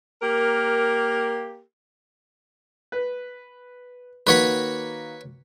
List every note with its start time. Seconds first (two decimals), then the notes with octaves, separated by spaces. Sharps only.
0.22 A#3 G4 A#4
2.92 B4
4.27 D#3 A#3 F#4 B4 C#5 B5